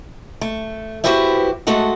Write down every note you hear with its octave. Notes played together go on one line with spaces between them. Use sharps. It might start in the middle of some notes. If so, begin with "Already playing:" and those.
A3
E4 F#4 G4 B4 C5 E5
G#3 A3 F#4 A4 F#5